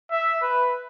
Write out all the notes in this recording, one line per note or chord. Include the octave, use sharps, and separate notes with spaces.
E5
B4